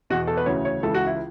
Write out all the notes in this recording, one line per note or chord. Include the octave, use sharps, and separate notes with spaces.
E2 B2 F#4
A4
B4
D2 C#3 E3 C#5
C#5
C#2 C#3 E3 A4
F#4
E4